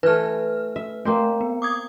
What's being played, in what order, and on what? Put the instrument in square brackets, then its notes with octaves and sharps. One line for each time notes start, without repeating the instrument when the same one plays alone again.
[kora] E3 A3 [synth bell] B4 F6
[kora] E5
[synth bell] A3 [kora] A#3 C4 C5
[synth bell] B3
D6 D#6 G#6